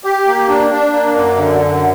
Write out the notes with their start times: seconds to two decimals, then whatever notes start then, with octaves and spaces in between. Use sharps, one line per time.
0.04 G4
0.27 A#3
0.48 D4
0.70 D4
0.93 A#3
1.15 F#2
1.36 D3
1.58 F#2